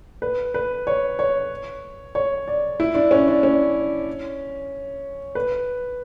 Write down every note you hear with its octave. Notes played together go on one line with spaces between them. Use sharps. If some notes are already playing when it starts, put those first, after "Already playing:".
B4
B4
C#5
C#5
C#5
D5
E4
D4
C#4
D4
C#4
B4